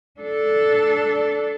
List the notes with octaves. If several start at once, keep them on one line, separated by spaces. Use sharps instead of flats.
D4 A4